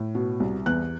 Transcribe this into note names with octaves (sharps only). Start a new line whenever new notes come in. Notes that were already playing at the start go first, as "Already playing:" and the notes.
Already playing: A2
B2
C2
E2 F#6